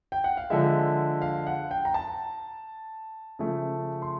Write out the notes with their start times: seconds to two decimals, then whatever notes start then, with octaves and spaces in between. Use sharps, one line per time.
0.12 G5
0.24 F#5
0.37 F5
0.50 D3 F3 G#3 E5
1.22 F5
1.47 F#5
1.71 G5
1.85 A#5
1.94 A5
3.39 C#3 F3 A3
4.02 C6